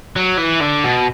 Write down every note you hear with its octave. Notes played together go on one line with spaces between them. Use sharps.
F#3
E3
D3
B2